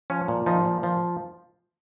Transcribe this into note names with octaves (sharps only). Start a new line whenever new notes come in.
F3 C#4
A#2
F3 D#4
A#2
F3